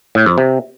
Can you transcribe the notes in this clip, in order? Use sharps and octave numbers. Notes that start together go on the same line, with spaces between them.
A2
F2
C3